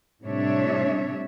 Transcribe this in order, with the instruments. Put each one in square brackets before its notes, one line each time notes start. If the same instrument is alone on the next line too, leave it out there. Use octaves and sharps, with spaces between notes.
[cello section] A2 C3 G3 D4 C#5 E5